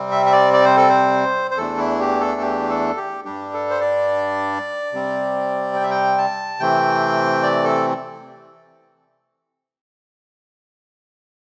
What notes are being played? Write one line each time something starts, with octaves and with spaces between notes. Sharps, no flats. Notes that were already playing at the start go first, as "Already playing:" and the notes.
Already playing: C3 G3 C4
E5
E5
D5
D5
C5
A4
C5
C5
E2 E3 A3 D4 A4
E4
G4
A4
G4
A4
G4
G2 G3 D4 G4
A4
C5
D5
C3 G3 C4
G5
E5
G5
A5
C3 E3 A3 C4 G5
D5
A4